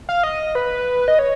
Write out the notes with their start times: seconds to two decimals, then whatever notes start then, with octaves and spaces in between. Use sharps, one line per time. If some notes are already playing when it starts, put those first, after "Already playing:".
0.09 F5
0.23 D#5
0.55 B4
1.08 D#5
1.19 C#5